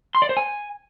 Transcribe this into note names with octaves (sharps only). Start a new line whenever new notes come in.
C6
D5
C5
G#5